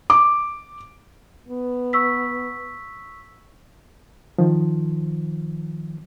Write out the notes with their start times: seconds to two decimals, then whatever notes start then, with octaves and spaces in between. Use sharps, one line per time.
0.10 D6
1.49 B3
1.93 C#6 E6 B6
4.38 D#3 F3